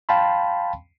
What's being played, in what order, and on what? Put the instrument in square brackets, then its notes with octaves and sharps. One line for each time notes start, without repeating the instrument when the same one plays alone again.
[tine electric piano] F5 G5 A5 B5 C6